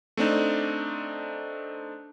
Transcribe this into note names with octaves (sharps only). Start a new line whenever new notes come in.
A3 C4 D4 D#4